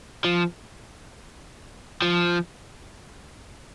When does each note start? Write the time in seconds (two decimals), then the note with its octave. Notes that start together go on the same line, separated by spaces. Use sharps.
0.24 F3
2.02 F3